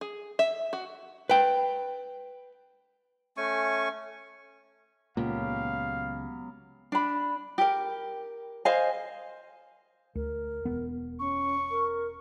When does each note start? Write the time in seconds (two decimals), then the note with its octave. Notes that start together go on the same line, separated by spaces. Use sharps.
0.01 G#4
0.39 E5
0.73 F#4
1.30 B4 G5
3.37 A3 C#4 G#5 C#6
5.17 C#2 A#2 F#3 B3 G4 F5
6.92 D4 B5
7.58 G4 A#4
8.65 C5 D#5 F5 G#5
10.15 D2 A#4
10.65 E1 B3
11.19 C#4 C#6
11.71 A#4